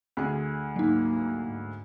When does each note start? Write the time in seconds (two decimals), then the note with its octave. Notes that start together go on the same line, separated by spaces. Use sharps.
0.17 D2 G#4
0.76 G#2 F#3 A#3 D#4
1.47 G#2